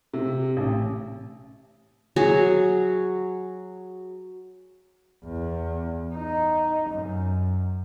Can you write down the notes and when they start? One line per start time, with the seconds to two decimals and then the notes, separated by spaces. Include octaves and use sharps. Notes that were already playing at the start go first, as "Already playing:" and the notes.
0.13 C3
0.57 A1
2.16 F#3 F#4 G#4 C#5
5.25 E2
6.14 D#4
6.90 F#2